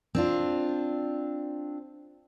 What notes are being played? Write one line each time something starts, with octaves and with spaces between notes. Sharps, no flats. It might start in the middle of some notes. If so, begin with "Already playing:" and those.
C4 D4 F4